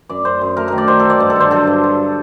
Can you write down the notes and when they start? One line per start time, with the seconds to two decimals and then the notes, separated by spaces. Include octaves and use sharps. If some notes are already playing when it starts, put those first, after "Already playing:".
0.09 F#2 D5
0.25 F#2 C5
0.41 F#2
0.57 A3 A#4
0.68 D#3 A#4
0.78 D5
0.88 D#3 C5
0.99 D#3 A4
1.10 D5
1.20 G2 C5
1.30 A4
1.36 D3 C5
1.51 F#3 A4
1.67 G2
1.84 F#3